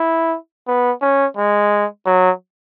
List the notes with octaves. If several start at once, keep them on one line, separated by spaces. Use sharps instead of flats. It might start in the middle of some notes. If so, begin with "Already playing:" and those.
Already playing: E4
B3
C#4
G#3
F#3